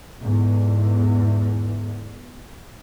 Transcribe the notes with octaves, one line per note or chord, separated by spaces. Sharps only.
E2 G#2 D3 E3